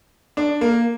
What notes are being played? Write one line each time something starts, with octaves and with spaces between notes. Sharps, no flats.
D4
A#3